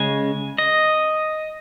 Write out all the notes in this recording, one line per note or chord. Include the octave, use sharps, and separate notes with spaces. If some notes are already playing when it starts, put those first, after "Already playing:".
Already playing: C#3 G#3 C#4 G#5
D#5